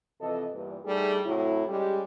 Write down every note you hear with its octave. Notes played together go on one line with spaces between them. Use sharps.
C3 E3 F3 A4 D#5
E2 G2 A#2
G3 A3 D4 D#4 G#4
A2 C3 F#3 E4
G3 G#3 C#4 G4